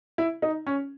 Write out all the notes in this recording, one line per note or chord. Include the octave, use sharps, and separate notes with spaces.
E4
D#4
C#4